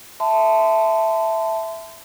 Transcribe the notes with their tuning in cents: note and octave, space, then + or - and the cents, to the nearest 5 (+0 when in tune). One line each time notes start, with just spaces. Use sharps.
E5 +0 A5 +0 C6 -30